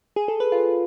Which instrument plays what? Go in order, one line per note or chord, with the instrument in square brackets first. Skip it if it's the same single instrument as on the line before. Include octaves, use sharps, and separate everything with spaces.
[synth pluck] G#4
A4
B4
F4